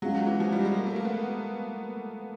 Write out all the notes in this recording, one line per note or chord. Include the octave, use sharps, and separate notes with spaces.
F#3 G#3 C#4 F4 G#4
F#3
E3
F3
G3
G#3
A#3
A3
A#3
B3